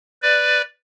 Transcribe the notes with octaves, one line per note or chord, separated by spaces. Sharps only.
B4 D5